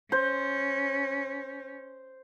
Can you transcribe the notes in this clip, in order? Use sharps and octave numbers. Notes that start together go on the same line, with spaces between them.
C#4 C5